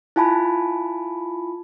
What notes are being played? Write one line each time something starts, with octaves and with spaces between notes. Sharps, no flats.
E4 F4 G#5 A5 B5